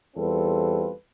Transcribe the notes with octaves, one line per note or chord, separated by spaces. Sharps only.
E2 G3 C4 F4 A4 B4